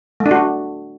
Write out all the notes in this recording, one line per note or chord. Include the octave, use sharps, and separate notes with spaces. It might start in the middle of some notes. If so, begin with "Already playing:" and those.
A3
D4
F#4